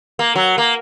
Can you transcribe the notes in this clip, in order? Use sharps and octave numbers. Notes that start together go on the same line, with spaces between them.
A#3
F#3
A#3